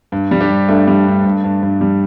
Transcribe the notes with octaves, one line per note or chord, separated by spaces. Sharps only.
G2
G3
D4 G4
G2
G2 A3 D4
G3
G2
G2
G2
G2
G3